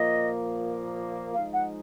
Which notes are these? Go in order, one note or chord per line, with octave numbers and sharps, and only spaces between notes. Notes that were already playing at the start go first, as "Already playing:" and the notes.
Already playing: A#2 F3 A#3 D#5
F3 G#3 D#4 F5
F#5